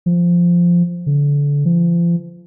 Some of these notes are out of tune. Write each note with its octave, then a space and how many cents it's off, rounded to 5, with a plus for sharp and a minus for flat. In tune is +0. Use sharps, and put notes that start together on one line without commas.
F3 -5
D3 -30
F3 -35